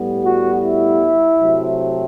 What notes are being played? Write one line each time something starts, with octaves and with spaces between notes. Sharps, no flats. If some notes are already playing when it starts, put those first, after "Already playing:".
Already playing: A2 G3 B3
F#4
E4
C3 F#3 A3 C4